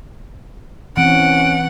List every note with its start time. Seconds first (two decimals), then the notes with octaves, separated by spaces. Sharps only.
0.97 E3 C4 C#4 F#5 D7